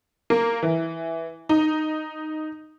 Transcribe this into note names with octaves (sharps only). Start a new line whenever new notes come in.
A#3
E3
D#4